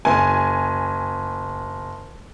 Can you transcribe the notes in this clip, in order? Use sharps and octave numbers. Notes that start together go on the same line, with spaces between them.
F#1 G#5